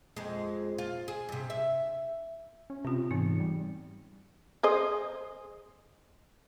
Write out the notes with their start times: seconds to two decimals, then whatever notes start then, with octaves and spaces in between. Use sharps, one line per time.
0.16 F2 G#3
0.78 F4
1.08 G#4
1.29 G2 C3
1.50 E5
2.70 C#4
2.85 C3 C4 F4
3.11 G#2 E3 B3 D#4
3.40 G3
4.63 G#4 C5 D#5